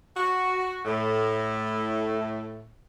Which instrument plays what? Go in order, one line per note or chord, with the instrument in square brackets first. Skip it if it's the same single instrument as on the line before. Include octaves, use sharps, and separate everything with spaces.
[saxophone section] F#4
A2